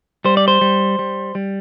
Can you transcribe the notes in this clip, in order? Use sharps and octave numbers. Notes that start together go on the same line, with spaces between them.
G3 C5
D5
C5
G3
G3
G3